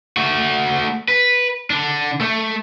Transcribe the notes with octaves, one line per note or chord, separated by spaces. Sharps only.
A3 F#4
B4
D3 D4
A3